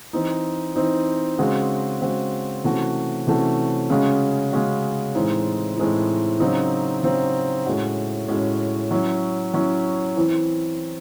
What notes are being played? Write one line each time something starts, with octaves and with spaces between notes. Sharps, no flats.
E3 C4 D#4
E3 C4 D#4
C#3 G#3 C4 F#4
C#3 G#3 C4 F#4
C3 E3 A3 C#4 F#4
C3 E3 A3 C#4 F#4
C#3 G#3 C#4 F#4
C#3 G#3 C#4 F#4
A2 E3 G#3 C4 D#4
A2 E3 G#3 C4 D#4
C#3 F#3 C4 D#4
C#3 F#3 C4 D#4
A2 G#3 C#4 F#4
A2 G#3 C#4 F#4
F#3 C#4 E4
F#3 C#4 E4
E3 C4 E4